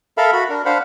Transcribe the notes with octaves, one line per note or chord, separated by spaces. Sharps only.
A4 A#4 E5 F5 B5
F#4 B5
D4 A#4
D4 C5 F5 F#5 B5